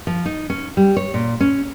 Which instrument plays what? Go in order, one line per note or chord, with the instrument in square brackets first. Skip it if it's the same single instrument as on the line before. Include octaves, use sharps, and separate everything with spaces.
[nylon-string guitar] F3
D#4
C#4
G3
C#5
A#2
C#4